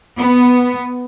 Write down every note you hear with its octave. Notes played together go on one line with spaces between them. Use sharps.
B3